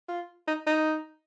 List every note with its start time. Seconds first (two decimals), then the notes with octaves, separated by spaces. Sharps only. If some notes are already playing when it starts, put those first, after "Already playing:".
0.09 F4
0.48 D#4
0.67 D#4